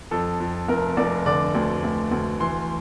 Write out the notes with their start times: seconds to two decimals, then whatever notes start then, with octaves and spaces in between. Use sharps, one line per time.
0.11 F2 A4
0.40 F2
0.68 F1 A#4
0.97 F1 D5
1.26 D3 D5
1.55 D2
1.83 D2
2.12 D2
2.40 E3 C6